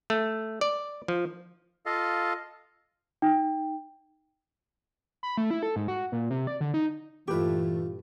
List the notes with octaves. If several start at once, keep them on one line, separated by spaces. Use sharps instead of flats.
A3
D5
F3
F4 A4 D#5 F5
D#4 G5
B5
A3
E4
A4
G#2
F#4
A#2
C3
D5
D3
D#4
G2 A#2 E3 A3 F4 G4 B4 C#6